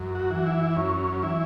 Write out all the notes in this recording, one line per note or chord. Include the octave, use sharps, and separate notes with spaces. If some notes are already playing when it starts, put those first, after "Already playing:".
Already playing: F#2
F#4
E3
E4
F#2 C#4
E3 E4